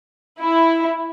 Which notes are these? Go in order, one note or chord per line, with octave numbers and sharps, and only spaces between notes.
E4